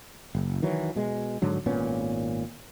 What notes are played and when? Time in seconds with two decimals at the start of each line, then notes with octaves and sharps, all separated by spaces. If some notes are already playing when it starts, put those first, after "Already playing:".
0.35 F#1
0.62 D#3 E3 F#3
0.96 B2 G#3
1.42 G#2 D3 F#3
1.66 G#1 A#2 B3 C#4